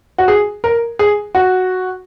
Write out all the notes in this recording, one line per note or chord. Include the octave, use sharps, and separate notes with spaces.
F#4
G#4
A#4
G#4
F#4